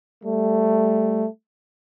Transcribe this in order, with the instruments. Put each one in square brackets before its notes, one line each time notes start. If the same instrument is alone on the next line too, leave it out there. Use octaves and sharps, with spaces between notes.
[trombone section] G3 A3